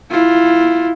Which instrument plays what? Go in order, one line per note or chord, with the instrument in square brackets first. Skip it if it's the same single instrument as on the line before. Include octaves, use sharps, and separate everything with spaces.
[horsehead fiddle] E4 F4